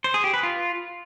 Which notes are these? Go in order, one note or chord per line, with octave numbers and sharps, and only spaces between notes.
C5
G#4
G4
B4
F4